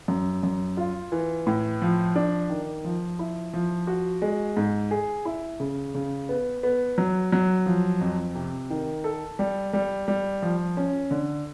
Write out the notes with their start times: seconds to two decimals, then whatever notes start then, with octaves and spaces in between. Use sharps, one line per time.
0.08 F#2
0.43 F#2
0.77 F4
1.12 E3
1.46 A2
1.82 F3
2.16 D4
2.50 D#3
2.84 F3
3.19 E4
3.53 F3
3.87 F#4
4.22 G#3
4.57 G#2
4.91 G#4
5.25 E4
5.60 C#3
5.94 C#3
6.29 B3
6.63 B3
6.98 F#3
7.32 F#3
7.66 F3
8.01 F2
8.35 C3
8.70 D#3
9.04 A4
9.39 G3
9.73 G3
10.08 G3
10.42 F3
10.77 C#4
11.11 D3